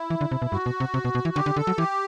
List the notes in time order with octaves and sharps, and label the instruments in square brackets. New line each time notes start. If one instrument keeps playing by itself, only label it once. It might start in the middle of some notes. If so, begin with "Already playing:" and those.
Already playing: [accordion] E4
[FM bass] E3
D3
C3
B2
[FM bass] G2 [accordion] F#4
[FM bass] B2
C3
C3
B2
B2
E3
[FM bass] D3 [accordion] G4
[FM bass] D3
[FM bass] D3 [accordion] A4
[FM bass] F#3
[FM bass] E3 [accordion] G4